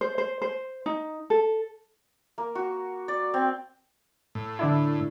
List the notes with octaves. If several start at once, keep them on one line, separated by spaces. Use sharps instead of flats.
C5
C5
C5
D#4
A4
A#3
F#4
D5
C4
A2
D3 D4 E4